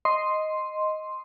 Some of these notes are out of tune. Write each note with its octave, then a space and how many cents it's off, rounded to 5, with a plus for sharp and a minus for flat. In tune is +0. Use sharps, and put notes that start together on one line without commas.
D#5 +0 C6 +0